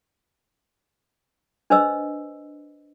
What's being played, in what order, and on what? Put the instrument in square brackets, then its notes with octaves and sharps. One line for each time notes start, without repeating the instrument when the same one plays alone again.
[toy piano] D4 B4 C5 D#5 E6